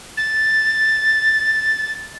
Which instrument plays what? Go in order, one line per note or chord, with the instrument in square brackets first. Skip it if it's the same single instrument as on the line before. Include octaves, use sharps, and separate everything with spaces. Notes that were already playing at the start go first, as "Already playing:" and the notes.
[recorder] A6